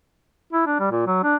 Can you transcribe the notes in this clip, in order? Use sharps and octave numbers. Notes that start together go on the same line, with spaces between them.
E4
D4
G3
A#2
F#3
D4